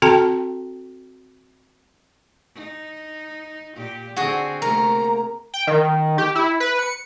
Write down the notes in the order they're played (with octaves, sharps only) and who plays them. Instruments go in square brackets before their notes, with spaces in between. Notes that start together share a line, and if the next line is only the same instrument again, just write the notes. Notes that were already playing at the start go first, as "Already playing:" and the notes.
[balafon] C4 F#4 A4 G5 A5 A#5
[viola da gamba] D#4
A#2 G4
[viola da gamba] D3 C4 [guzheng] F#4 G#4
[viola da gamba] C3 A3 A#3 [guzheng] A#4 [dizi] A#5
[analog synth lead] G5
D#3
G4
E4
B4
C#7